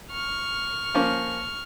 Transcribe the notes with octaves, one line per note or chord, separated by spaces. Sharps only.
C#6 F6
F3 A#3 C#4